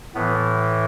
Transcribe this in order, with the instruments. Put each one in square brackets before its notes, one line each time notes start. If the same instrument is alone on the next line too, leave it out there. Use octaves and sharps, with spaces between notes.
[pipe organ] A2 E3 B3